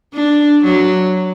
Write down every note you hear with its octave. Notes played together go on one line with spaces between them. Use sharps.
D4
F#3